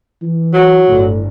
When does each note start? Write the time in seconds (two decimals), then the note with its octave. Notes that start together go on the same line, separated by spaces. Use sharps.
0.22 E3
0.53 F#3
0.88 G1 A2